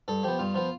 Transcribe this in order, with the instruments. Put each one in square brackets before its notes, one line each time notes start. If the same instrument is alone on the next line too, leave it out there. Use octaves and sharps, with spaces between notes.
[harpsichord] G2 A4
F3 B3 G4
G2 F4
F3 B3 F4